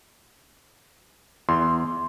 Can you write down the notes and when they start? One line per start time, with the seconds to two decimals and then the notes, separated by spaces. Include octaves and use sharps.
1.49 E2 C6